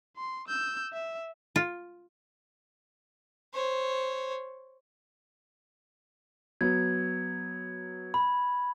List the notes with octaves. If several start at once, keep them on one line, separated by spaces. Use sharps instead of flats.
C6
E6 G6
E5
F4
C5 C#5
F#3 B3 G#6
B5